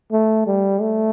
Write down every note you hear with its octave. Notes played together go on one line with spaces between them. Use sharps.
A3
G3
A3